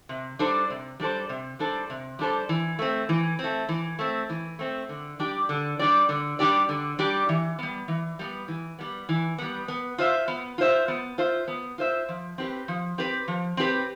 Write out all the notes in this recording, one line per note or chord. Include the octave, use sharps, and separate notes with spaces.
C3
G3 D4 A4 C5
C3
G3 D4 A4 C5
C3
G3 D4 A4 C5
C3
G3 D4 A4 C5
E3
A3 C4
E3
C4
A3
E3
A3 C4
E3
A3 C4
D3
G3 D4 G4 D5
D3
G3 D4 G4 D5
D3
G3 D4 G4 D5
D3
G3 D4 G4 D5
E3
G3 B3
E3
G3 B3
E3
G3 B3
E3
G3 B3
B3
F4 C5 E5
B3
F4 C5 E5
B3
F4 C5 E5
B3
F4 C5 E5
F3
C4 G4 B4
F3
C4 G4 B4
F3
C4 G4 B4